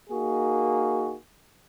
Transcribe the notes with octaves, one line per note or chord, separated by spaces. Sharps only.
A#3 D#4 F#4 G#4